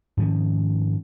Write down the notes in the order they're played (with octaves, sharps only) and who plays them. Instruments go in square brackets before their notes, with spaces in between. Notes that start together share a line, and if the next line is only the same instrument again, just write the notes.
[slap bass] G#2 D#3 F3 C#4